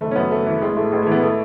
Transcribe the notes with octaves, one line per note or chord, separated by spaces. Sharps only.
F#1 A3
C#4
F#2 B3
F#1 A3
E3
A1 G#3
A2 A3
A1 G#3
E3 A3
B3
A3